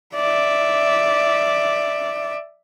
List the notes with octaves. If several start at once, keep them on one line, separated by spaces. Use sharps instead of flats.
D5 E5